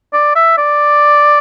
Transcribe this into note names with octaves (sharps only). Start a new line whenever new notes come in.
D5
E5
D5